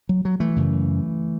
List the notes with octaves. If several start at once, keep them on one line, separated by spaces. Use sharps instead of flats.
F#3
F#3
E3 A3
F#2 C#3